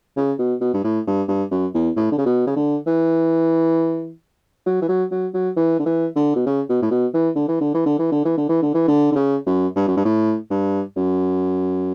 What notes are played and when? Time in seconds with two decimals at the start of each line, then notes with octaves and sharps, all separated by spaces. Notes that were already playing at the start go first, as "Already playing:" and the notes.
0.17 C#3
0.39 B2
0.61 B2
0.74 G2
0.84 A2
1.07 G2
1.28 G2
1.51 F#2
1.74 E2
1.96 A2
2.11 D3
2.18 C#3
2.26 B2
2.47 C#3
2.56 D3
2.87 E3
4.66 F#3
4.82 E3
4.88 F#3
5.11 F#3
5.34 F#3
5.57 E3
5.79 D3
5.85 E3
6.16 D3
6.36 B2
6.46 C#3
6.69 B2
6.82 A2
6.91 B2
7.14 E3
7.36 D3
7.48 E3
7.61 D3
7.74 E3
7.86 D3
7.99 E3
8.12 D3
8.25 E3
8.37 D3
8.49 E3
8.62 D3
8.74 E3
8.88 D3
9.12 D3
9.15 C#3
9.46 F#2
9.76 G2
9.87 F#2
9.96 G2
10.05 A2
10.50 G2
10.96 F#2